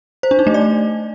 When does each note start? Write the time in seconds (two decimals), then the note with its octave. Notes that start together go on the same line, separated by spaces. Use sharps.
0.23 C5
0.31 D4
0.39 D#4
0.47 A3
0.54 D5